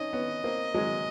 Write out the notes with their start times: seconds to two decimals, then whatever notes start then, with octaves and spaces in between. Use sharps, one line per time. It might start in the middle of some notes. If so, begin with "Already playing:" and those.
Already playing: C#4 D#4 D#5
0.13 B3 C#4
0.44 A#3 C4
0.74 F#3 G#3